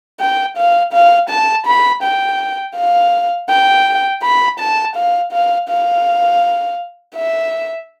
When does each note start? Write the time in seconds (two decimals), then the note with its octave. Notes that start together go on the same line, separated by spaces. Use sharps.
0.20 G5
0.57 F5
0.93 F5
1.30 A5
1.66 B5
2.03 G5
2.76 F5
3.49 G5
4.23 B5
4.59 A5
4.96 F5
5.32 F5
5.69 F5
7.15 E5